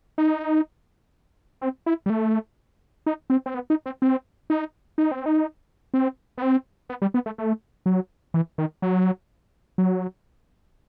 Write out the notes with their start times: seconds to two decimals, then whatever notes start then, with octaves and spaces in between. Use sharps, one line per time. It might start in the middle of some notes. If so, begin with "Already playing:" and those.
0.18 D#4
1.62 C4
1.86 E4
2.06 G3
2.10 A3
3.06 D#4
3.30 C4
3.46 C4
3.54 B3
3.70 D#4
3.86 C4
4.02 C4
4.50 D#4
4.98 D#4
5.11 C4
5.26 D#4
5.94 C4
6.38 B3
6.42 C4
6.90 B3
7.02 G3
7.14 B3
7.26 A3
7.38 A3
7.86 F#3
8.34 E3
8.58 D#3
8.82 F#3
9.78 F#3